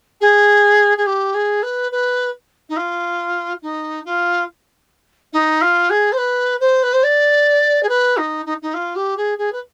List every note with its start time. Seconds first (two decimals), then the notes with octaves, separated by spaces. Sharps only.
0.20 G#4
0.97 G#4
1.06 G4
1.34 G#4
1.62 B4
1.91 B4
2.68 D#4
2.76 F4
3.62 D#4
4.05 F4
5.32 D#4
5.61 F4
5.89 G#4
6.12 C5
6.17 B4
6.60 C5
6.82 B4
6.93 C5
7.03 D5
7.82 G#4
7.88 B4
8.17 D#4
8.45 D#4
8.62 D#4
8.73 F4
8.95 G4
9.16 G#4
9.37 G#4
9.52 B4